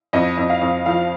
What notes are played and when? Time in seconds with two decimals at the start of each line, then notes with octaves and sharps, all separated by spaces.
0.13 F2 D#5
0.37 F2
0.50 F5
0.61 F2
0.86 F3 F5